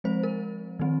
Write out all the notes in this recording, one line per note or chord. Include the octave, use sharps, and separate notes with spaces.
F3 G#3 C4 C5
A#4
D#3 G3 C4